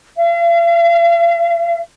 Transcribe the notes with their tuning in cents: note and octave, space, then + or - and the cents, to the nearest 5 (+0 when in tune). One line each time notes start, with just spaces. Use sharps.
F5 -45